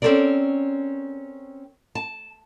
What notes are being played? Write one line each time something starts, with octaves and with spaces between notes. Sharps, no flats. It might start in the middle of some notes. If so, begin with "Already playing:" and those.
C4 C#4 F4 A4 A#4 D5
A5